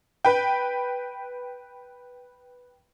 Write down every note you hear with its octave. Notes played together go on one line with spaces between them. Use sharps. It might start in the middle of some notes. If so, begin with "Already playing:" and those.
B4 G5